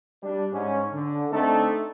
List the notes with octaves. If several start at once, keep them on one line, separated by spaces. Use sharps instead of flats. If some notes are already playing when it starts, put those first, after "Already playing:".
G3 D4
G#2 C#4
D3
A3 C4 D4 D#4 A4